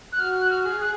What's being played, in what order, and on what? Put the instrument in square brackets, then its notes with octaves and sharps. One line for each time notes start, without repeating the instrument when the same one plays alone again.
[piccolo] F#6
[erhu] F#4 [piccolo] F6
[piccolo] F#6
F6
[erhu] G#4
[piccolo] F#6